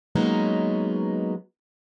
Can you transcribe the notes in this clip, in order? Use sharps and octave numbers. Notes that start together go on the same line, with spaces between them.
F#3 G#3 A#3 B3 C#4 D#4